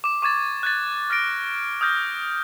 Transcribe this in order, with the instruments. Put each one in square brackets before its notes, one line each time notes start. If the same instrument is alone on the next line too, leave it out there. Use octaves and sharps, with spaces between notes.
[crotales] D6 E7
C#6 D6 G#6 A6
F#6 G#6 A6
F6 A6 A#6 D7
D#6 F6 G6 A#6